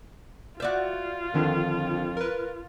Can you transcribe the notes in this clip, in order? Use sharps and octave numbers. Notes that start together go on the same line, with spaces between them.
F4 F#4 D5 E5 G6
F2 D3 D#3 D4
A#4 B4